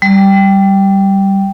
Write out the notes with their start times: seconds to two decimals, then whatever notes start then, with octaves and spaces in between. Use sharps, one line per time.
0.02 G3